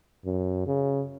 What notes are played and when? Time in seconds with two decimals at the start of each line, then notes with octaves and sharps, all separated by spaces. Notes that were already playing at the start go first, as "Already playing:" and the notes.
0.25 F#2
0.67 C#3